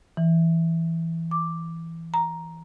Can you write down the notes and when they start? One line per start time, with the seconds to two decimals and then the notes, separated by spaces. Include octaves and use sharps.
0.17 E3
1.31 D6
2.14 A#5